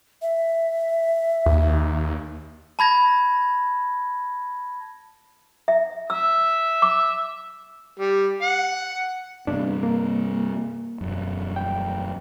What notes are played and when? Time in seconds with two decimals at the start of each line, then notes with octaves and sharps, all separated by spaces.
0.22 E5
1.46 D#2
2.79 A5 B5 G#6 A#6
5.68 E5
6.10 E5 E6
6.82 D6
7.99 G3
8.42 F#5
9.47 G2 C3 G3 B3 D4
9.83 A#3
11.01 E1 F#2
11.56 G5